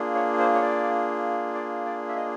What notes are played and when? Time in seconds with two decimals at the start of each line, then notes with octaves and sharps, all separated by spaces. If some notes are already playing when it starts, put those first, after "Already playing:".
Already playing: A#3 D4 F4 G#4
0.15 C#5
0.39 C5
0.54 C#5
0.62 D5
1.55 D5
1.86 D5
2.09 E5
2.16 D#5